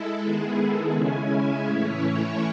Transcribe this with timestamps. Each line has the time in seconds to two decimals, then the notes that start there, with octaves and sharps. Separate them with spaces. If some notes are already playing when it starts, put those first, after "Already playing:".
Already playing: G#3 E4 A4
0.23 D#3 G#3 B3 E4 G#4
0.58 A4
0.93 C#3 G#3 C#4 E4 G#5
1.29 E5
1.63 A2 E3 A3 C#4 E4 C#5